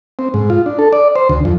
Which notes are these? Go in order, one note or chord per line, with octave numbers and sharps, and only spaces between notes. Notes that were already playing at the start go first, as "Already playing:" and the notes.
C4
G#2
F4
D4
A4
D5
C5
D2
F2